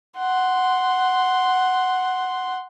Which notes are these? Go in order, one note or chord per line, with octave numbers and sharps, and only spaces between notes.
F#5 C6